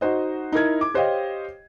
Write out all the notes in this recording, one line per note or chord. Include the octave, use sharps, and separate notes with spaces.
D#4 F#4 C5 D#5
D#4 E4 A#4 G#6
D6
G4 C5 C#5 D#5 F5 G5